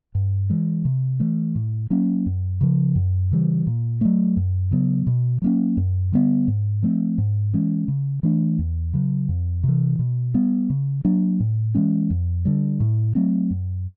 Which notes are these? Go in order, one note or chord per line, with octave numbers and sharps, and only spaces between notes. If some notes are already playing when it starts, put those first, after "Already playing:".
G2
E3 G#3
C3
E3 A3
A2
F#3 A#3 C#4
F#2
C#3 F3
F#2
C#3 E3 G3
A#2
F#3 A3
F#2
C#3 F#3 B3
B2
F#3 A#3 C#4
F#2
D3 G3 B3
G#2
F3 A3 C4
G#2
E3 G#3 C#4
C#3
E3 A3 D4
E2
C#3 F#3
F2
C3 E3
B2
G3 B3
C#3
F#3 A#3 D4
A2
E3 G#3 C#4
F2
D3 G3
A2
F#3 A3 C4
F#2